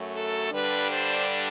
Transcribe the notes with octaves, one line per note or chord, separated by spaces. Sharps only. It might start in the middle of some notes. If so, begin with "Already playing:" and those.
Already playing: F#2 F#3 A3
A4
G2 D3 G3 D4 B4
C5